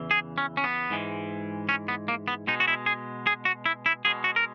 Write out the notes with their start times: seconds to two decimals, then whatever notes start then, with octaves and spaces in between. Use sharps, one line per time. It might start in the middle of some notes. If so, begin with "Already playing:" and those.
Already playing: E2 C#3 E3
0.11 G#4
0.38 C#4
0.57 C#4
0.64 B3
0.90 G#2 E3 G#3
1.69 C#4
1.88 B3
2.08 A#3
2.28 B3
2.47 B2 G#3 D#4
2.60 F#4
2.68 E4
2.86 G#4
3.27 G#4
3.45 F#4
3.66 E4
3.86 E4
4.05 B2 G#3 G#4
4.24 F#4
4.36 A#4